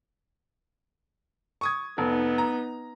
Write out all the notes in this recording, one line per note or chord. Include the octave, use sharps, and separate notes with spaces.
C#6 D#6 G#6
F1 B3 D#4
A#5